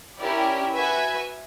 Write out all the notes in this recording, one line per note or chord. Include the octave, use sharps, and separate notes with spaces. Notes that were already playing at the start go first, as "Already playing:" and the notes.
C#4 E4 G4 A#4 D5
F#4 B4 E5 G#5